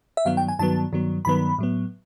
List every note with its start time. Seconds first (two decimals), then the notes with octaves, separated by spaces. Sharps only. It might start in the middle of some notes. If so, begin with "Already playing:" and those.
0.17 E5
0.25 G2 D#3 F#3 B3 F5
0.37 G5
0.48 G#5
0.59 G2 D#3 F#3 B3 A5
0.92 G2 D#3 F#3 B3
1.25 G2 D#3 F#3 B3 B5
1.58 A2 F#3 B3